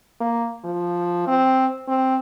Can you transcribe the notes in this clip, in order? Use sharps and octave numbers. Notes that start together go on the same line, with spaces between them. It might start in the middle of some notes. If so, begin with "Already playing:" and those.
A#3
F3
C4
C4